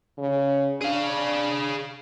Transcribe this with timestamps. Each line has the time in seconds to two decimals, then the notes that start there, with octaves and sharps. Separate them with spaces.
0.18 C#3
0.81 D4 G#4 F5